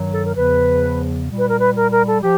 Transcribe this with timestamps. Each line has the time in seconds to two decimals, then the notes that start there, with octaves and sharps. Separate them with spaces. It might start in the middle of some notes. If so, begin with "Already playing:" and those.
Already playing: G2 D#3 F#3
0.13 A4
0.24 A#4
0.35 E2 C#3 F3 B4
1.28 A#2 G3
1.39 B4
1.49 A#4
1.59 B4
1.76 A#4
1.91 A#4
2.08 A4
2.22 F3 G4